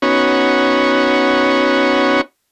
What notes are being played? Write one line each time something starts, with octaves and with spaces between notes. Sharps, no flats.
B3 C#4 D#4 F#4 C#5